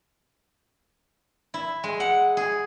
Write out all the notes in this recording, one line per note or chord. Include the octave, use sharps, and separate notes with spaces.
E4
G#3
F#5
G#4